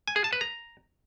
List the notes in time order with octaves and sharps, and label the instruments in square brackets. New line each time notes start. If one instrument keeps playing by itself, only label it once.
[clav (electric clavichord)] G#5
G#4
A5
B4
A#5